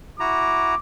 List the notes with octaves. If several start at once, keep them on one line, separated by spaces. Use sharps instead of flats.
E4 F#4 A#5 D6